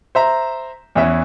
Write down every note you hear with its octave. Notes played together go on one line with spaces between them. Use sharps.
C5 E5 A#5
E2 E3 C#4 E5